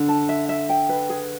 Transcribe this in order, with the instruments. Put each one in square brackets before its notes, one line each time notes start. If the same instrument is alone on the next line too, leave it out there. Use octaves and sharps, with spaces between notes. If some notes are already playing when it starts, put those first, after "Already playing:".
Already playing: [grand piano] D3
[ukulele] A5
E5
E5
G5
B4
G#4